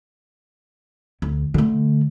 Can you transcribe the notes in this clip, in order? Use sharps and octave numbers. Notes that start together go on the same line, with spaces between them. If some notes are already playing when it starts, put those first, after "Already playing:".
D2
D3 A3